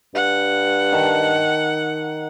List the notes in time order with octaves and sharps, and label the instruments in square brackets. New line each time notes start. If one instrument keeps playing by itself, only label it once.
[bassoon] G2 [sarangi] F#5
[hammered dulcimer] D#3 A5